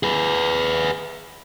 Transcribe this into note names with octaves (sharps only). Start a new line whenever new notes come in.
G#4 B4